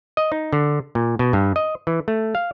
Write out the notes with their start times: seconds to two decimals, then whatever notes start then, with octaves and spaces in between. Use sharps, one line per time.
0.17 D#5
0.32 D#4
0.53 D3
0.95 A#2
1.19 B2
1.33 G2
1.56 D#5
1.87 E3
2.08 A3
2.35 F5